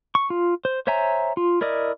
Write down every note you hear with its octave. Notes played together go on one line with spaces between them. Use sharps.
C#6
F4
C5
C5 C#5 E5 G#5 A#5
F4
E4 A#4 D5 D#5